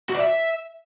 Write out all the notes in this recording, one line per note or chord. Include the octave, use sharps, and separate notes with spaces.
F#4
D5
E5